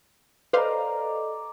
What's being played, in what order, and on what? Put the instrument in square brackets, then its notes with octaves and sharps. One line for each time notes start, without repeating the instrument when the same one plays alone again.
[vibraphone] A4 D#5 [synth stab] B4 C5 F5 [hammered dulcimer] D5 A#5